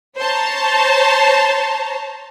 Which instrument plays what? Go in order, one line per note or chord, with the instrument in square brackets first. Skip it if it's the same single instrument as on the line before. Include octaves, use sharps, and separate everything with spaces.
[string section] C5 C#5 A5 A#5